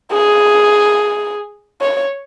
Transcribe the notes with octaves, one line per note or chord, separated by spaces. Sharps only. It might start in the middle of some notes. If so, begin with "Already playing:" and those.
G#4
C#5